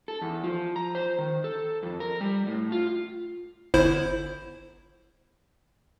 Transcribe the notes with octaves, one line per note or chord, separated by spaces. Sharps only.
A4
E2
F3
A#5
C5
D#3
A4
F2
A#4
G3
A2
F4
G1 E4 C5